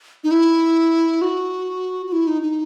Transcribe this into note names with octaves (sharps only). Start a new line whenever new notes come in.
D#4
E4
F#4
F#4
E4
D#4
D#4